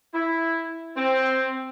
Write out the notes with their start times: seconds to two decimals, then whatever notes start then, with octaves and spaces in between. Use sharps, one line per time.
0.13 E4
0.96 C4